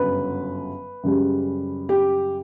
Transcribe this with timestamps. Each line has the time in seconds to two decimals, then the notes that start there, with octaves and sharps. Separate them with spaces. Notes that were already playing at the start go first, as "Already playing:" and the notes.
Already playing: G1 F#2 C#3 F#3 B4
1.03 F#2 C#3 G3
1.89 G4